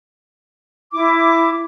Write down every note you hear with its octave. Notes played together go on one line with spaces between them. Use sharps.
E4 D6